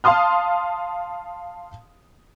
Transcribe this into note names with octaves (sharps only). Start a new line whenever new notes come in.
F5 A5 C6 D#6 F6